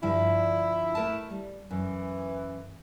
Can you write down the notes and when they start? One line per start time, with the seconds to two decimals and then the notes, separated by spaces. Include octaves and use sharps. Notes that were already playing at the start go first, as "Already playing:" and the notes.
0.03 G2 D3 F3 E4
0.95 A3 A#4 A5
1.30 G3
1.71 F#2 E3